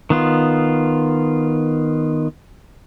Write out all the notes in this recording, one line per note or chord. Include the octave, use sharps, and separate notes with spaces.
D#3 B3 F4